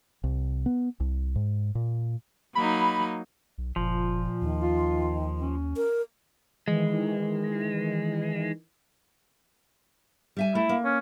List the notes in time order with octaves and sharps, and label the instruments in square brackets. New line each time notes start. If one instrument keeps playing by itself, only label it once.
[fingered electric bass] C2
B3
C2
G#2
A#2
[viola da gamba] F#3 A#3 D#4 [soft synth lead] B5
[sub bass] B1
[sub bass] F#1 [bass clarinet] A#2 [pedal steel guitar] F3
[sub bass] D#2 [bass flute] D#3
[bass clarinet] F4
C#4
[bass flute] A#4
[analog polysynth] D#3 E3 [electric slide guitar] G#3
[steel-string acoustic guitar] G3 E5 G#5
[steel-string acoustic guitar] A3 [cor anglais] E4
[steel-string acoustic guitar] A#3
[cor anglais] C#4